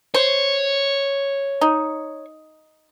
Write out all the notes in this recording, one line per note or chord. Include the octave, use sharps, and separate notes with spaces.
C5 C#5
D#4